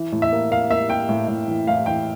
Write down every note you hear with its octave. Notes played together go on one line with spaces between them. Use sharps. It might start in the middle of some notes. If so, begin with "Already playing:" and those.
Already playing: E3
A2
E5
A#3
A#3 F5
A#3 E5
A#3 G5
A2
A2
E3
A2 F5
E3 G5